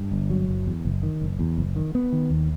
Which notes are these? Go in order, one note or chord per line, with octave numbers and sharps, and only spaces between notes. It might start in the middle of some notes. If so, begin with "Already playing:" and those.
Already playing: G2
G1
F#3
F#1
E2
F#1
D#3
F#1
E2
F#1
D#3
B3
D#3
D#2